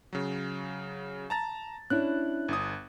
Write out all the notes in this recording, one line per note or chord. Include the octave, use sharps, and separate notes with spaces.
C#3 F#3
A5 A#5 A6
C#4 D4 E4 F#6
G1 D#6